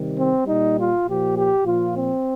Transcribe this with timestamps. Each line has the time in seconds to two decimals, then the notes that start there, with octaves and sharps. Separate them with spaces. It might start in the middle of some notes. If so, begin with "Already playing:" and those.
Already playing: C3 D#3 G3
0.16 C4
0.45 A#2 G3 D#4
0.76 F4
1.05 A#2 F3 G4
1.35 G4
1.64 A#2 F3 F4
1.95 C4